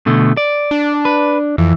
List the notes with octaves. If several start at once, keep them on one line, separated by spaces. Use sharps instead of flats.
B2 D3 A3
D5
D4
B4
F2 E3